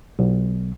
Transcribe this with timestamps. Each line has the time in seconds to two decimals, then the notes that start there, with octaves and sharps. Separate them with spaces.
0.19 B1